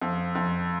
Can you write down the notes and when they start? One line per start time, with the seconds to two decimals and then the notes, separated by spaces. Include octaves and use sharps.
0.02 F2
0.35 F2